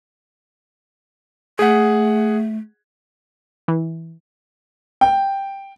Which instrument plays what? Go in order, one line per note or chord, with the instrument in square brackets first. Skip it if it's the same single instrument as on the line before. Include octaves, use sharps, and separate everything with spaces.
[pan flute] A3 [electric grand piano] G#4 F#5
[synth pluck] E3
[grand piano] G5